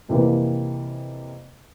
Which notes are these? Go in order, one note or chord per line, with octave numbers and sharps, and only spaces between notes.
F2 C3 E3 A#3